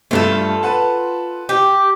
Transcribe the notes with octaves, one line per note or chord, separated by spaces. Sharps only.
G2 A3 F4 F#4 A4
B4 F#5 A5
G4